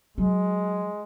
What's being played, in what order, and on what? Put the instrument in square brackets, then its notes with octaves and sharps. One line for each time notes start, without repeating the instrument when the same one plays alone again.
[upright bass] F#3 [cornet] G#3